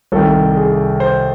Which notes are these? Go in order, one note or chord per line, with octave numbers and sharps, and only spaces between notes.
C2 C3 D#3 A4
G#4
C5